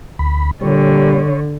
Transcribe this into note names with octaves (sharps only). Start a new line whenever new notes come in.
D2 B5
A#2 D3 G3 C#5